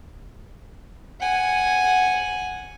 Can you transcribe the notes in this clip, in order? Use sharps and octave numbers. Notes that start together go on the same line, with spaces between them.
F#5 G#5